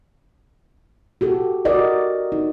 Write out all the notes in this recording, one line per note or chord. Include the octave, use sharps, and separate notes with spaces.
F#4 G4 A4
F#4 A#4 D5 D#5
D#4